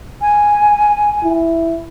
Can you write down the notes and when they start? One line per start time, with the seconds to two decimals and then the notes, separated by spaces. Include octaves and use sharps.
0.22 G#5
1.23 E4